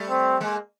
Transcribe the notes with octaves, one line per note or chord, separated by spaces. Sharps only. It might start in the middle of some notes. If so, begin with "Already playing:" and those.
Already playing: G3 A3
C4
G#3 A#3